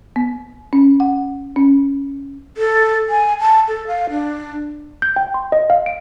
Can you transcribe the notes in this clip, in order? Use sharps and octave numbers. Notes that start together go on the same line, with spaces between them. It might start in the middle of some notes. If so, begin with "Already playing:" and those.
B3
C#4
F#5
C#4
A4
G#5
A5
A4
F5
D4
G6
G5
C6
D#5
F5
D7